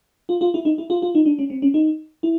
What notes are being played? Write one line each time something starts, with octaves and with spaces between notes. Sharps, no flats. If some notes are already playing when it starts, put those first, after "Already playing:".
F4
F4
E4
D#4
E4
F4
F4
D#4
D4
C#4
C4
C#4
D#4
E4